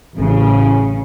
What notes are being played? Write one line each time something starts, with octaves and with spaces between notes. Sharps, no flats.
A1 C#3